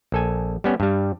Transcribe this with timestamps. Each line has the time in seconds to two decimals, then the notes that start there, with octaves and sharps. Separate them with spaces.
0.12 A#1 A4 G#5
0.64 G3 B3 C#4
0.80 G2 G3